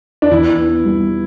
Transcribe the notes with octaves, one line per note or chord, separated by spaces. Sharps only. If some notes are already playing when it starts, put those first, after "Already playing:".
D4
E2 E4
B3
G3